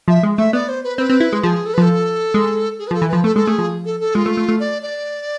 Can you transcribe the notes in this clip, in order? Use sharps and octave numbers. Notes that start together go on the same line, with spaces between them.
F3 E5
G#3
A3 E5
B3 D5
C5
B4
C4 B4
C4
E4
G#3
F3 G#4
A4
B4
F3 A4
G#3
G#4
B4
F3
A4
E3
F3 B4
A3 A4
G#3 A4
A3 G#4
F3
A4
A4
G#3 F4
A3
A3
A3
D5
D5